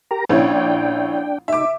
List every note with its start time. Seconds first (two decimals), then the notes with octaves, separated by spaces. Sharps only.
0.11 G4 A#4 A#5
0.29 A#1 C#4 D4 E4 G5
1.48 D#4 E5 D6